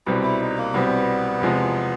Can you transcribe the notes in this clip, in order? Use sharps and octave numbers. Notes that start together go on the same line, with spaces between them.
C2 B2 G3 C4 E4
E4
D#4
A#3
C2 B2 G3 B3 C4
E2 C3 F3 G#3